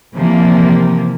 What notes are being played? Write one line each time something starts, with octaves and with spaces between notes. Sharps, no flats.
C3 E3 F3 A#3